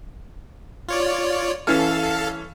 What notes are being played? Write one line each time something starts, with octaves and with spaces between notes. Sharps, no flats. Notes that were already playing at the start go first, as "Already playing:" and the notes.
F4 C#5 D5
E3 C#4 A4 F5 A5 F6